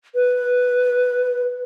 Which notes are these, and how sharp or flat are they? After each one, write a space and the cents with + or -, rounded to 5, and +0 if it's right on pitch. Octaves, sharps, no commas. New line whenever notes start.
B4 +0